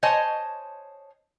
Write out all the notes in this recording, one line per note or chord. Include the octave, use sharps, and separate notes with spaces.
C5 C#5 D#5 G#5 A5